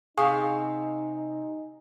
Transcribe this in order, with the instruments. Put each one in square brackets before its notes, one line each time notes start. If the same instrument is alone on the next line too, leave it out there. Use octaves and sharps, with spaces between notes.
[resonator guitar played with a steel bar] C3 F5 [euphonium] D#4 [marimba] G#4 C#6 D#6 [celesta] G#5